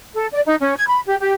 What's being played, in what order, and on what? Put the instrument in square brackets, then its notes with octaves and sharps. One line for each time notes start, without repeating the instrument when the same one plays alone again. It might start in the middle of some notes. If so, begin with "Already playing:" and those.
[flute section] A4
D5
D#4
C#4
G#6
B5
G4
G4